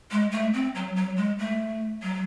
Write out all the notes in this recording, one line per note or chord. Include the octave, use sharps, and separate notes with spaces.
G#3
A3
C4
F#3
F#3
G#3
A3
F#3